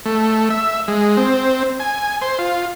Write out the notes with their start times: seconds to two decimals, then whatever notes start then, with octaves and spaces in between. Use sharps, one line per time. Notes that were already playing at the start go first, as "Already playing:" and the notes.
0.06 A3
0.50 E5
0.88 G#3
1.17 C4
1.80 G#5
2.22 C5
2.39 F4